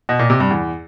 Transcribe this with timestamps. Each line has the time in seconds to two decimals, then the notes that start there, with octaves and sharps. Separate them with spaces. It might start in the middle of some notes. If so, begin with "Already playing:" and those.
0.09 B2
0.19 A#2
0.30 C3
0.40 G2
0.51 E2